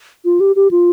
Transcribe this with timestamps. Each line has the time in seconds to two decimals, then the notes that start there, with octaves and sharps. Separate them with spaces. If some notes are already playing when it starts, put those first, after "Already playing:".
0.25 F4
0.40 G4
0.56 G4
0.71 F4